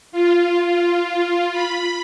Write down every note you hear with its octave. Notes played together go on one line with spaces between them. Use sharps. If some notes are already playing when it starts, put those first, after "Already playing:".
F4
F4
B5